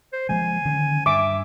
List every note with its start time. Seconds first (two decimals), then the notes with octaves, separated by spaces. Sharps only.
0.13 C5
0.29 F3 G#3 A#3 G#5
0.65 D3 D#3 C#4
1.06 G2 E5 D6